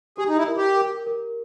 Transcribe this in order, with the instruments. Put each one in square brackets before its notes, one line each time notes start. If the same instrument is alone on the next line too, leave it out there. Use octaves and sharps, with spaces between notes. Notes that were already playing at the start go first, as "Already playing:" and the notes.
[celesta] G4 [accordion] G#4
[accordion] D#4
E4
[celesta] A#4
[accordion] G4
[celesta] A#4
A#4